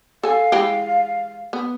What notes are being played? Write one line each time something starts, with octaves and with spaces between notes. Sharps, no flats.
A4 F5 G#5
E3 G#3 G4
B3